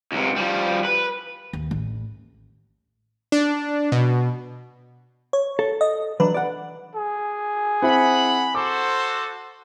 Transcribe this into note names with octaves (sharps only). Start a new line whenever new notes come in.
C#2 C3
F3 G3
B4
D#2
A1
D4
B2
C#5
A4
D#5
E3 F#3 D4 B4
D5 F#5
G#4
C4 E4 F#5 B5
F#4 A4 C5 D6